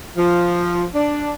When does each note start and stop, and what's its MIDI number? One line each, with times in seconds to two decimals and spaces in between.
0.17 0.85 53
0.94 1.33 62